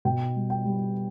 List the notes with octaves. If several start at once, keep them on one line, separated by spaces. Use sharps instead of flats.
B2 G5
G3
G5
G3